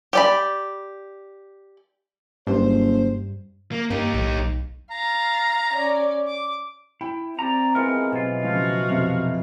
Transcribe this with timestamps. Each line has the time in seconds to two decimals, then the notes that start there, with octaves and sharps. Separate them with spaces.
0.13 G4 D5 B5
2.47 F#1 G2 C5
3.72 A#3
3.91 G2 A#3 D#4 G4
4.14 B1 A2
4.38 B1
4.91 F5 A#5 A6
5.73 C#4 D5
6.27 D6
7.01 E4 G5
7.39 C4 G4 D5 A#5
7.75 E3 F3 G#3 B3 A#4
8.12 B2 F#3 F4 B5
8.43 C#3 F3 F#4 F5
8.90 F2 C3 F3 E5